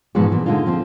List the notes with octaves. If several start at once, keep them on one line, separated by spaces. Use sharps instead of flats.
G#2 B2 E3 F3 G#3 F#4
A#2 E3
D3 G#3 A#3 C4 D#4 F4
F3 C4 F4